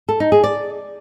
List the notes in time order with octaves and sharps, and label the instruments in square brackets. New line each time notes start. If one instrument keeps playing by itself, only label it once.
[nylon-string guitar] A4
D#4
G#4
D5